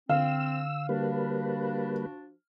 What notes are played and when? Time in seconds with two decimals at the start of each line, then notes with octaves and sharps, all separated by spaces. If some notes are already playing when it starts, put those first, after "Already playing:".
0.09 D3 C4 F5 E6
0.89 F3 G3 A#3 D4 F#4 B4